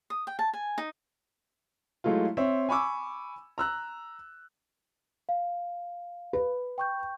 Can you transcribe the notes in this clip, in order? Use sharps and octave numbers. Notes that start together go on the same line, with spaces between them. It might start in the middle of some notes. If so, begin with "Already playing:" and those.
D#6
G5
A5
G#5
D#4
F#3 G#3 A3 E4 F4
C4 C#5 E5
G#5 B5 C#6 D6 E6
A#5 E6 F#6
F5
B4
G5 C#6 G6